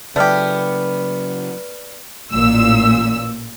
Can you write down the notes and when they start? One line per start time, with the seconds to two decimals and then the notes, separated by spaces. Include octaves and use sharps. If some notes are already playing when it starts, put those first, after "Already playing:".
0.16 C#3 F#3 A3 B3 G4 D5 F6
2.32 A1 A#2 E6